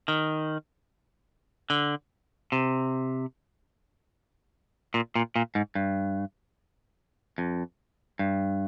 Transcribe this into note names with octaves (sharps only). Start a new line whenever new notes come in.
D#3
D3
C3
A#2
A#2
A#2
G#2
G2
F2
G2